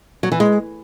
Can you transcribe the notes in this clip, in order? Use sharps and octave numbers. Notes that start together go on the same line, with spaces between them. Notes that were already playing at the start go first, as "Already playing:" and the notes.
F#3
E3
G#3